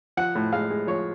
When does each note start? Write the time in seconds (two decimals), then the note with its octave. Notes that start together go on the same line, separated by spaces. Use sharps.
0.17 F3 F#5
0.35 A2
0.53 G#3 F5
0.70 G#3
0.87 F3 C#5